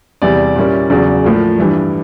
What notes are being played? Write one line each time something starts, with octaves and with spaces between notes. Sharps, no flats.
E2 C3 E3 G3 D5
A#2 G3 A#3 C#4 E4
E2 C#3 F#3 D5
A2 F3 A#3
G2 E3 G3